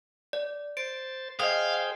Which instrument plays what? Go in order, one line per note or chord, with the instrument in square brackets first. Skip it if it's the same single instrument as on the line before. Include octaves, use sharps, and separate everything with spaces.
[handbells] D5
[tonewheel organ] C5 A6 [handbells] D7
[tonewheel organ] G#4 C5 G5 [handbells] D#5 D#6 [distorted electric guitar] F5